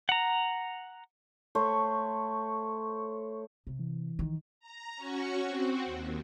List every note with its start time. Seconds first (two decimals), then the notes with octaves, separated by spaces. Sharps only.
0.09 F#5 A#5
1.55 A3 C5 C#5
3.67 C3
3.79 E3
4.19 D#3
4.60 A#5
4.96 C#4 F#4 C#6
5.41 C4 F#4
5.85 D#2